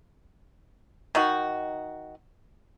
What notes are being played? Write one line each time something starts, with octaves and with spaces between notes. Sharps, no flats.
D#3 D#4 F#4